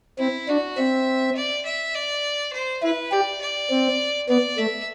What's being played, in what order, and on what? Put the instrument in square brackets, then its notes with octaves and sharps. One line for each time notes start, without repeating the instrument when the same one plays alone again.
[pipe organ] C4 [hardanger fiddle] E4
[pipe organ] D4 [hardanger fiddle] F#4
[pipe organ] C4 [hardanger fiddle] E5
[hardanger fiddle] D5
E5
D5
C5
[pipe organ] E4 [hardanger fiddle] B4
[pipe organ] G4 [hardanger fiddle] D5
[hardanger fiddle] D5
[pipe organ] C4
[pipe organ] B3 [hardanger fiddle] D5
[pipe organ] A3 [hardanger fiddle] E5